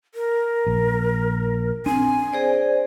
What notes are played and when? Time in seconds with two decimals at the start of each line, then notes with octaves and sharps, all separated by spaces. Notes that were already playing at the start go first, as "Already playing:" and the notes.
0.15 A#4
0.67 A#1
1.86 C4 D4 G#5
2.33 G#4 C5 D5